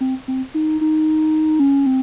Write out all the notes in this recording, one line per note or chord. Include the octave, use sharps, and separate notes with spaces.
C4
C4
D#4
D#4
C#4
C4